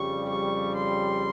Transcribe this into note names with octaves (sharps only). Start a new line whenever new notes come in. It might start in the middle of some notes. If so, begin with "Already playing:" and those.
Already playing: F2 C#3 G3 C#6
C#6
C6